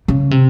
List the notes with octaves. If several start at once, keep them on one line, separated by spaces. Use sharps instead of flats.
C#3
C3